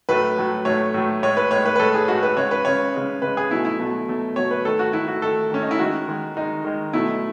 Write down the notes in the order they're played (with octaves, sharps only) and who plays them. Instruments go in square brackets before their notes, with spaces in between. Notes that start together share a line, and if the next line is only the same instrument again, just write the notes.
[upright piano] A2 F#3 A3 B4
A2 F#3 A3
A2 F#3 A3 C#5
A2 F#3 A3
A2 G#3 C#5
B4
A2 G#3 C#5
B4
B4
A2 G#3 A4
G#4
A2 G#3 F#4
B4
C#3 G#3 C#5
B4
C#3 G#3 C#5
C#3 G#3
C#3 G#3 B4
G#4
B2 F#3 A3 E4
E4
B2 F#3 A3
B2 F#3 A3
B2 F#3 A3 C#5
B4
D#3 A3 A4
F#4
D#3 A3 E4
F#4
D#3 A3 A4
D#3 A3 C#4
D#4
E4
D#3 G#3 F#4
D#3 G#3
D#3 G#3 D#4
D#3 G#3
B2 F#3 A3 E4